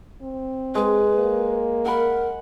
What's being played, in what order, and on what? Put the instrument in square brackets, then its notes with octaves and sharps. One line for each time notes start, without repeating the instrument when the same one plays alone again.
[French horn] C4
[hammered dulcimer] G#3 [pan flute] B4
[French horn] A#3
[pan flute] A#4 [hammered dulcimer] F#5 B5